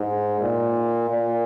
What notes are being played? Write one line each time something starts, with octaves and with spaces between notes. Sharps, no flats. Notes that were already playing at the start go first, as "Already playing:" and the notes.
Already playing: G#2
A#2
A#2